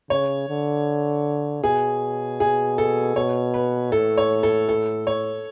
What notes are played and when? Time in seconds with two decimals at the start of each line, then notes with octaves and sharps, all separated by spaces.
0.10 C#3 C#5
0.49 D3
1.63 B2 G#4
2.40 G#4
2.78 A4
3.15 B2 C#5
3.54 B4
3.92 A2 A4
4.18 C#5
4.43 A4
4.69 A4
5.07 C#5